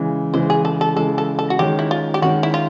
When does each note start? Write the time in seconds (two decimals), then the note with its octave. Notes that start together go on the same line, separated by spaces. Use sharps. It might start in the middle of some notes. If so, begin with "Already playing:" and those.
Already playing: C#3 E3 G#3
0.34 C#3 E3 G#3 C5
0.50 G#4
0.65 A4
0.81 A4
0.96 C#3 E3 G#3 A4
1.18 A4
1.39 A4
1.50 F#4
1.59 D#3 G#3 C#4 G4
1.79 E4
1.91 F4
2.14 G4
2.22 D#3 G#3 C#4 F#4
2.43 E4
2.54 F4